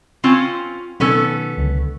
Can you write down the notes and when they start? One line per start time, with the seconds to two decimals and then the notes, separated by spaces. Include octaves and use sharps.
0.24 C4 C#4 F4
1.00 B2 D#3 F#3 B3 C#4 A4
1.58 C#2 D3